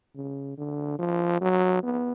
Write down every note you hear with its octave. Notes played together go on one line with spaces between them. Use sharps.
C#3
D3
F3
F#3
B3